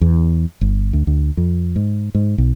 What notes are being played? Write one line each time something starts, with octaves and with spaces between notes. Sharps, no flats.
E2
G1
D2
D2
F2
G#2
G#2
B1